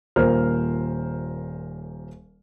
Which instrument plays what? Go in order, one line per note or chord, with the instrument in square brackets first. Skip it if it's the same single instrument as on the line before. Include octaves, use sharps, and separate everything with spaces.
[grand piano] D#1 A#2 F4 A#4 C5 F6